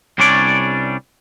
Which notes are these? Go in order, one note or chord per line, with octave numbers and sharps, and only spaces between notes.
C2 G3 C#4 D4 C#5 D5